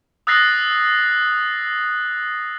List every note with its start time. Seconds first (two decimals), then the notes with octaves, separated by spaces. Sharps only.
0.27 D#6 E6 F#6 A6 A#6 C7